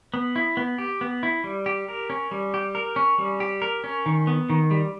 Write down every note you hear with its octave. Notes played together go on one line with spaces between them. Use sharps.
B3
E4
B3
G4
B3
E4
G3
G4
A#4
C#4
G3
G4
A#4
C#4
G3
G4
A#4
C#4
D#3
B3
D#3
G3